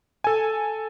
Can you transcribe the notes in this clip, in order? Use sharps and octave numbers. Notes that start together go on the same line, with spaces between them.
A4 G#5